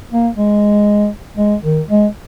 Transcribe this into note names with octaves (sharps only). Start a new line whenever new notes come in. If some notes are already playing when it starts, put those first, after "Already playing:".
A#3
G#3
G#3
D#3
G#3